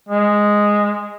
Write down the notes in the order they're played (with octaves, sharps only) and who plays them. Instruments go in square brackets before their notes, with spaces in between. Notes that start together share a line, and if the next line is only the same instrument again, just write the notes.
[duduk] G#3